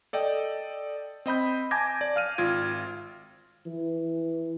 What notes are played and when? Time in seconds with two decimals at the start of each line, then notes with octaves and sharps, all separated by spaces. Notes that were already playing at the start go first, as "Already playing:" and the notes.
0.13 A4 D5 D#5 G5
1.26 C4 D#5 B5 G6
1.71 G#5 A5 D6 G6 G#6 A#6
2.01 D5
2.16 F5 F6 D#7
2.38 G#1 F4 G#6 D7
3.66 E3